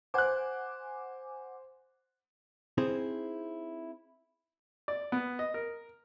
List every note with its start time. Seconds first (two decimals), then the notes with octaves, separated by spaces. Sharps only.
0.14 C5 F#5 G#5 D6 F#6
2.78 C4 D#4 E4 G#4 C5
4.88 D5
5.12 B3
5.39 D#5
5.54 A#4